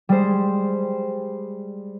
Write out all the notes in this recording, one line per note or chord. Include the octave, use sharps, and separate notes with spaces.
G3 G#3 C5